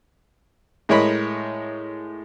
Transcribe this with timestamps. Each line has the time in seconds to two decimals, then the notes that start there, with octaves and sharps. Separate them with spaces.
0.89 A2 G#3 A#4 C#5 D#5 B5